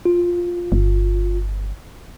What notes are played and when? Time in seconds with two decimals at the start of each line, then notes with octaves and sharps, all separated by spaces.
0.05 F4
0.72 G1